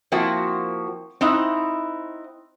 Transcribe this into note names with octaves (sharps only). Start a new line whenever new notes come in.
F3 A#3 C4 E4 F#4
C4 D#4 E4 F#5